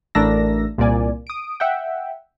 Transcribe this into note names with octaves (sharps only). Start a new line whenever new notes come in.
A1 A3 D4 A#4 E6 A#6
C2 A#2 A#3 D5 G#5
D#6 D7
E5 F#5 G5